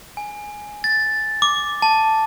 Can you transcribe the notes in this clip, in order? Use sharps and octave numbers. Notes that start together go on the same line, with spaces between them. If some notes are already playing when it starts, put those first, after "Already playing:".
G#5
A6
D6
A5